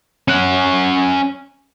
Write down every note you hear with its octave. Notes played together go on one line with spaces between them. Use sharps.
C#4 F#5